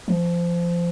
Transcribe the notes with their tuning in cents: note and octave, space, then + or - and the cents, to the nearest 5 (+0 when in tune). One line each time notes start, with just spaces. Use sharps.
F3 -20